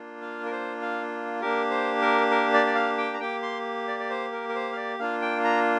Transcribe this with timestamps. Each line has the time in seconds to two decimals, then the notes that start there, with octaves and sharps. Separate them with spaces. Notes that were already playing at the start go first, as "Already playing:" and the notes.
Already playing: A#3 D4 F4
0.22 F5
0.45 A#4
0.52 C5
0.81 F5
1.41 A#3 D4 G4 A#4
1.70 C5
2.01 A#4
2.31 A#4
2.54 D5
2.66 D5
2.75 F5
2.98 G5
3.14 A#5
3.20 A#3 G4 G5
3.42 C6
3.88 D5
4.00 D5
4.10 C5
4.32 A#4
4.49 A#4
4.55 C5
4.72 F5
4.77 D5
4.99 A#3 D4 F4 F5
5.22 G5
5.44 A#5